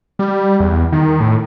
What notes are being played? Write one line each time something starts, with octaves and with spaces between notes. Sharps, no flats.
G3
E2
D#3
A2